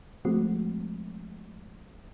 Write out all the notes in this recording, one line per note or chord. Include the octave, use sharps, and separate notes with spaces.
F3 G#3 A3 C4 F#4